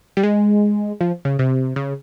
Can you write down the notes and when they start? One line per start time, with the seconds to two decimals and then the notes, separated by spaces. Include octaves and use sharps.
0.17 G3
0.23 G#3
1.01 F3
1.25 C#3
1.39 C3
1.76 C#3